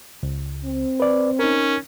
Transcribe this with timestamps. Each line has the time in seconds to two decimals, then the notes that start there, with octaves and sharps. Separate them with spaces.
0.23 C#2
0.64 C4
1.00 B4 D5
1.39 C#4 D#4 A#4